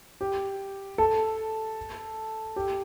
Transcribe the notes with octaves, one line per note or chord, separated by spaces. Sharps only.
G4
A4
G4